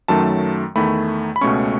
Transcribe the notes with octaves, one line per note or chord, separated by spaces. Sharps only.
F#2 D#3 F#3 A3 A5
E2 D#3 A3 B5
B5
C#2 B2 A3 C#4 C#6